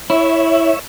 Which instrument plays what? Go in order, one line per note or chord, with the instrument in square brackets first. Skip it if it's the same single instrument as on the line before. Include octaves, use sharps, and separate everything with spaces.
[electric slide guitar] E4 [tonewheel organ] C#5 E5